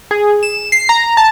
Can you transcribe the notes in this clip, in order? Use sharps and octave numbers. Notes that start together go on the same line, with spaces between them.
G#4
E7
C7
A#5
A5